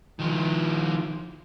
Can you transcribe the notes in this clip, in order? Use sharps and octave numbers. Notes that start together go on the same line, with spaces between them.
D#3 F3